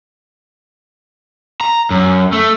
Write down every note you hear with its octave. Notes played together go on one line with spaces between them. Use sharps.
A#5
F#2
A3